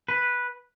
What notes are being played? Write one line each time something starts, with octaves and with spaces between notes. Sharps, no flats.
B4